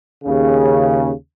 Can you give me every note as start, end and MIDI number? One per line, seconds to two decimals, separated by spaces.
0.24 1.10 39
0.24 1.10 49